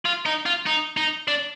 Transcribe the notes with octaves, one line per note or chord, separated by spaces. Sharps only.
F4
D#4
F4
D#4
D#4
D4